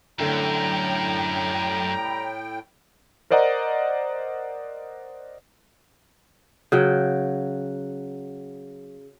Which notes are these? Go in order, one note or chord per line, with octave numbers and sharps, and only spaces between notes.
F#2 A2 D3 G3 A3 G5 A#5
B5
A#4 C5 D5 D#5 F#5 A#5
C#3 F#3 G5